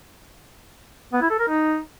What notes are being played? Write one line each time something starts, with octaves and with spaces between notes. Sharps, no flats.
B3
E4
A4
A#4
D#4